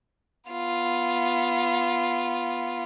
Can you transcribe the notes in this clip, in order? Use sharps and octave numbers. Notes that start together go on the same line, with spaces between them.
B3 F4